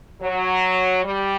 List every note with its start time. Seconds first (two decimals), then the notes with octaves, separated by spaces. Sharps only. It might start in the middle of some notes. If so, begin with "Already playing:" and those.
0.21 F#3
1.03 G3